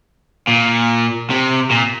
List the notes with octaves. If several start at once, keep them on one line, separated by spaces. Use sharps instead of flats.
A#2
C3
A#2